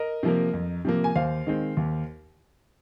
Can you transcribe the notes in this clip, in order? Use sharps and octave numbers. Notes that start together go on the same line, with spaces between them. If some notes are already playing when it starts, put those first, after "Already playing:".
Already playing: A#4 D#5
C3 F3 A#3
F2
C3 F3 A#3
G#5
D#2 C5 F5
D#3 G#3 C4
D#2